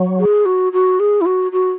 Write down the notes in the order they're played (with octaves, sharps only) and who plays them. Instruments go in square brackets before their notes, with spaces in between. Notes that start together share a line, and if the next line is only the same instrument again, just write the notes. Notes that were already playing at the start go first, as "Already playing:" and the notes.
Already playing: [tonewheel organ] F#3
[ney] G#4
F#4
F#4
G#4
E4
F#4
F#4